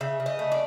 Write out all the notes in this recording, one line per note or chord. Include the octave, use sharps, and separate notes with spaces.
C#3 E5
C#3
D#5
A3
D5